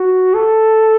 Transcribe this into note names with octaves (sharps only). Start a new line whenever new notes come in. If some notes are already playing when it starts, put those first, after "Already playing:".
Already playing: F#4
A4